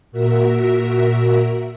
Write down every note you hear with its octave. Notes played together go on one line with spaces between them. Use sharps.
A#2 F#4 A#4 E5